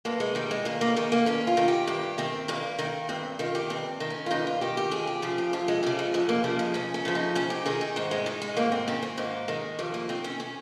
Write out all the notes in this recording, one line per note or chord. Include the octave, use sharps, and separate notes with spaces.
G2 A#3
G#3
D#3 G3
G#3
G2 A#3
A#3
D#3 G#3
A#3
G2 C#4
F4
D#3
G4
G2 G4
D#3 C4
G2 A#3
D#3 A#3
G2 C4
D#3 F4
G4
G2 C4
D#3
C#4
F4
G2 D#4
F4
D#3 G4
G4
F2 G#4
G4
C#3 F3 G#4
G4
F2 F4
G#3
C#3 F3 G3
G#3
F2 G#3
A#3
C#3 F3 G3
G#3
F2 C#4
C#4
C#3 F3
D#4
G#2 C#4
G4
D#3 G#4
D#4
G#2 C4
G#3
D#3 G#3
G#3
G#2 A#3
C4
D#3 C#4
C4
G#2 A#3
D#3 G#3
F2 G3
A#3
D#3 C4
C#4
C#4